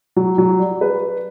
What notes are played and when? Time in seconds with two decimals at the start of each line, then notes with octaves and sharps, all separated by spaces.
0.16 F#3
0.38 F#3
0.59 G3
0.81 B4